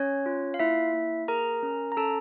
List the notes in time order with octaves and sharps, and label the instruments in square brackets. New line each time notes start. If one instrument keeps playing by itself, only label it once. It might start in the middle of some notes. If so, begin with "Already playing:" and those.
Already playing: [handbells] C#4 C#5
F4
F5
A#3 E4 E5
A#3
G#4 A#4 A#5
C#4
A#5
C#4 A4 A5